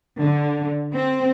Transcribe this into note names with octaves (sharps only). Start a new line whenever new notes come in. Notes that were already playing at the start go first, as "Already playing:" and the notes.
D3
C4